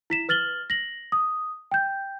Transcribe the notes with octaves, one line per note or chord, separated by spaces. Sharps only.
E4 B6 E7
B4 F6 A6 F#7 G7
A#6 F#7
D#6
G5 G6